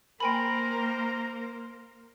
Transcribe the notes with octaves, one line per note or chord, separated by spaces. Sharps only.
A#3 A#4 C5 G5 G#5 B5